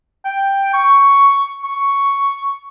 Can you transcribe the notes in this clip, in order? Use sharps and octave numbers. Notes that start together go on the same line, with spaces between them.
G5
C#6
C#6